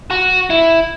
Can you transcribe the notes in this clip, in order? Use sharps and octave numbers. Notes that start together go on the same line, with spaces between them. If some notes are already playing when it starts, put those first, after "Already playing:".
F#4
E4